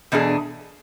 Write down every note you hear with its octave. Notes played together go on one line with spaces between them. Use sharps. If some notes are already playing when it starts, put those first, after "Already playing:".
E2 B2 B3 D4 G#4